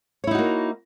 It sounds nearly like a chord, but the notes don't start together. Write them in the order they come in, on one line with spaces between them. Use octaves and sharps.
C#5 E4 D#4 F#4 A#3